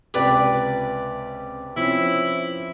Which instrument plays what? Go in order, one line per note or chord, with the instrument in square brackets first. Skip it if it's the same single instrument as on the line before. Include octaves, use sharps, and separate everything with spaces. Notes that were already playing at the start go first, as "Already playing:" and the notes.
[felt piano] C#2 C3 [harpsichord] G4 B4 D5
[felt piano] F3 C4 C#4 [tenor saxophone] E4